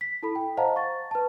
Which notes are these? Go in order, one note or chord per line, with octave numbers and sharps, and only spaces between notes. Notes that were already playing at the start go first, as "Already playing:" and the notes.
B6
E4 A4 B5
G5
C5 D#5 F5 F#5 A5 A#5
C#6 A6
B4 A5